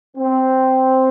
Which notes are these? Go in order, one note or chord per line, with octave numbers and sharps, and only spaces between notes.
C4